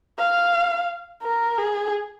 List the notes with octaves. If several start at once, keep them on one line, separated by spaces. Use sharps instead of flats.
F5
A#4
G#4